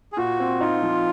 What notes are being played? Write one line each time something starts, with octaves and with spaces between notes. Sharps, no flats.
G#4
A#2 F#4
C4
D#4 F4
F3